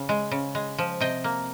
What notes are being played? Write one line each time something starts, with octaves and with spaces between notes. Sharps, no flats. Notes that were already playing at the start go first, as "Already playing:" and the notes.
Already playing: C#3
G#3
C#3
G#3
F3
C3 D#5 G5
A#3